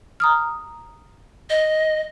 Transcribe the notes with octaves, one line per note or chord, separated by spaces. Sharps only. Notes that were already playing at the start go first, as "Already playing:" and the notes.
A#5 D#6 F6
D#5